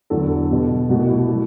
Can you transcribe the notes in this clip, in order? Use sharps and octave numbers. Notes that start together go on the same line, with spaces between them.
E2 D3 F#3 A4
B2 G3 B3
C2 B2 A3 F#4
E4
F#3 A3